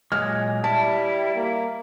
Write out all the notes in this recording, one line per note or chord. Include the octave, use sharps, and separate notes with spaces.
A#2 F#3 G#3 F6
G3 E4 A5
A#3